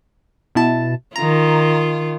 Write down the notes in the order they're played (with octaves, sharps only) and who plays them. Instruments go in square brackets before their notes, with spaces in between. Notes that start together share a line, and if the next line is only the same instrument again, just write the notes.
[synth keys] B2 E4 A5
[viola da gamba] D#3 F4 [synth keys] A#5